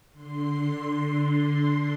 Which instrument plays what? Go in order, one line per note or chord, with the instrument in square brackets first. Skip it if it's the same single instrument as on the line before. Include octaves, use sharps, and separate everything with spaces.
[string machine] D3 C6